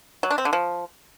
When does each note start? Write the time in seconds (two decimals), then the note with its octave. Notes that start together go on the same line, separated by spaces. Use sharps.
0.23 F#3
0.31 D4
0.38 C4
0.45 D3
0.53 F3